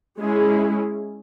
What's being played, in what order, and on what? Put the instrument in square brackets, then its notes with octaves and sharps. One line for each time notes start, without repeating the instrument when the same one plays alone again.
[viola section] G#3 C#4 E4 G#4